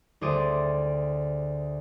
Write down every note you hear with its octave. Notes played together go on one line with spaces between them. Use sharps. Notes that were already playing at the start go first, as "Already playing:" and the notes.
D2 G4 G#4 C5 D5 D#7